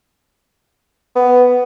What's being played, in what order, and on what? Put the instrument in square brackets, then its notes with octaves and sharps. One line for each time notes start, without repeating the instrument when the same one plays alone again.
[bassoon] B3